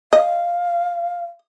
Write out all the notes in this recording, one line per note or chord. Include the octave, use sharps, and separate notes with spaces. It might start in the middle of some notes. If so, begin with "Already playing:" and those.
D#5 F5